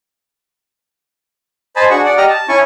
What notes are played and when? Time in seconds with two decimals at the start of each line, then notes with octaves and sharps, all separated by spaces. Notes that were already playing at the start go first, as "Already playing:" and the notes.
1.76 C5 D#5 G#5 A5 B5
1.90 D4 F#4 G#4 F#5 C#6
2.05 D5 F#5
2.17 G4 D#5 A#5 F6
2.29 A5
2.49 C#4 E4 G#5 C#6